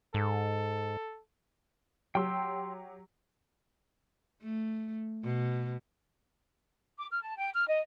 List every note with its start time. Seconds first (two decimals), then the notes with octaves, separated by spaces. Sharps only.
0.14 G#2 A4
2.15 F#3 G4 G5 C6 E6
4.42 A3
5.24 B2
6.98 D6
7.10 F6
7.21 A5
7.37 G5
7.54 F6
7.67 D#5